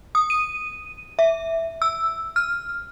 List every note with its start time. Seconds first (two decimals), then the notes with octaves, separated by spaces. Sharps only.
0.15 D#6
0.30 D#7
1.19 E5
1.82 E6
2.36 F6